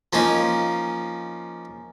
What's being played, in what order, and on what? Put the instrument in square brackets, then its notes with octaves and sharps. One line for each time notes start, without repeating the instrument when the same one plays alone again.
[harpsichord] F3 A#3 C#4 D#4